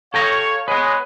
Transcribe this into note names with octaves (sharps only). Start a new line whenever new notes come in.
A4 C#5 F5 G5 A#5
G#3 B4 C#5 F#5